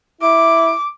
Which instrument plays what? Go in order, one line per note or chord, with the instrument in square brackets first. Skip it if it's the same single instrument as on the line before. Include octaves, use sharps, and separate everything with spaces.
[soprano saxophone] E4 [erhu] D6